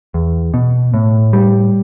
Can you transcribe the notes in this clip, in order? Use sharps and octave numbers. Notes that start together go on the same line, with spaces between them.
E2
B2
A2
G3